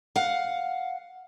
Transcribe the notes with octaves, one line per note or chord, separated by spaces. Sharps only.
F5 F#5